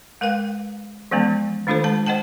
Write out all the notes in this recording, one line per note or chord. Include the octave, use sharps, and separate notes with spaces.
G#3 A#4 B4 F5 G5
E3 F3 G#3 B3 C#4
D#3 A3 D4 F4 A4 C5
G#3 A5
C5 D#5 F#5 G5 A5